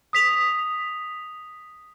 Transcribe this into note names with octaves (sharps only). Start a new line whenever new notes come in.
D#6 B6 F7